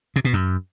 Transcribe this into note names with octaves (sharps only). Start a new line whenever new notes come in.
C3
B2
F#2